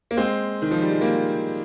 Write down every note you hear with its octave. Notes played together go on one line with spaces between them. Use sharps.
A#3
G#3 C4
D#3
F3
G3
G#3
G3 A#3